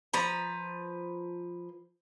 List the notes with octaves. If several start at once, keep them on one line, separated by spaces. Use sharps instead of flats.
F3 B4 A#5